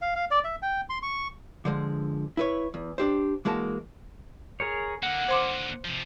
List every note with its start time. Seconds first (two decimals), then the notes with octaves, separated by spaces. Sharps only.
0.02 F5
0.16 F5
0.31 D5
0.44 E5
0.62 G5
0.89 C6
1.03 C#6
1.65 D3 F3 G#3
2.37 E4 B4 C#5
2.74 E2
2.98 D4 G4 C5
3.45 E3 G#3 A#3 F#4 A5
4.60 G#4 A#4 C#5
5.03 D3 A#3 F#5
5.28 C5 C6 D6
5.85 C3 F3